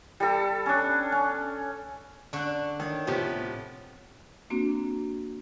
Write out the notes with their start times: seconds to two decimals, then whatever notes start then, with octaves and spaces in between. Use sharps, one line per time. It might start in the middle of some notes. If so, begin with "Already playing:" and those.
0.20 G3 A4
0.66 C#4 D4
1.12 C#4
2.33 D3 D4 C#6 F#6
2.79 D#3 D4 C#5
3.07 A2 C3 F3 B3 G4
4.50 A#3 C4 D4 F#4